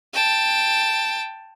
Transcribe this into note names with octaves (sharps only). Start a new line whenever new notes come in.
G5 A5